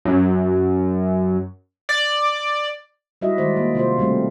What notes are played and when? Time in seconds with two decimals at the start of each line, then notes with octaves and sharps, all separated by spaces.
0.05 F#2
1.89 D5
3.21 G3 D#4 E4 F#4 D#5 E5
3.38 D#3 G#3 C5 D5
3.56 A#3
3.75 C3 F4 C5
3.98 B2 G3 A3 C4